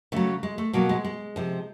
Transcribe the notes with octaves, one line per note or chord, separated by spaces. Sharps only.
C#3 F#3 A3
G#3
A3
B2 F#3 A#3
G#3
G#3
C3 F3